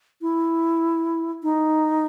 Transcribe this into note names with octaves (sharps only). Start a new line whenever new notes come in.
E4
D#4